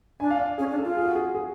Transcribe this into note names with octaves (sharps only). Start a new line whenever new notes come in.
D4 G#5
F5
D5
C#4 G#4
D4
A4
F4
G#4
F#4
G#4
G#4